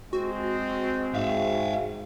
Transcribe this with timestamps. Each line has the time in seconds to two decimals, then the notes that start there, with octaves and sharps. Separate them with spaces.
0.13 G#3 C4 F#4
1.15 G#2 E5 F5